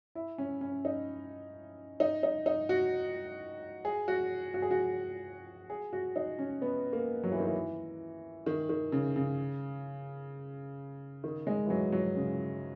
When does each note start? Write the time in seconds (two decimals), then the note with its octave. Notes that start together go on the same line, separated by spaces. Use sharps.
0.15 E4
0.38 C#4
0.61 C#4
0.85 D#4
2.00 D#4
2.23 D#4
2.46 D#4
2.69 F#4
3.85 G#4
4.08 F#4
4.54 F#4
4.62 G#4
4.71 F#4
5.70 G#4
5.93 F#4
6.16 D#4
6.39 C#4
6.62 B3
6.93 A#3
7.23 F#3
7.32 E3
7.40 D#3
7.47 E3
8.46 D#3
8.69 D#3
8.92 C#3
9.16 C#3
11.24 D#3
11.47 G#3
11.66 E3
11.70 F#3
11.92 F#3
12.16 C#3